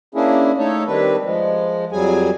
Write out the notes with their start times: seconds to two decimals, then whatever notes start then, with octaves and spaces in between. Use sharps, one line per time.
0.15 A#3 C#4 D4 E4 G#4
0.58 A3 D#4 A4 C#5
0.87 D#3 G3 C4 D4 B4
1.24 F3 G#3
1.92 F2 F#3 G3 G#4 G#5